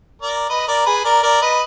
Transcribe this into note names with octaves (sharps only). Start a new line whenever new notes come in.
A#4 D5
B4 D#5
A#4 D5
G#4 B4
A#4 D5
A#4 D5
B4 D#5